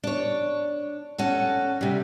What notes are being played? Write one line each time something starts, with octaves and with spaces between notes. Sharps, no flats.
D4 C#5
C#4 F#4 A4
C3 G3